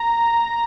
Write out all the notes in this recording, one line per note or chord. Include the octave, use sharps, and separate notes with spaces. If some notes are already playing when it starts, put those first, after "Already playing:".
Already playing: A#5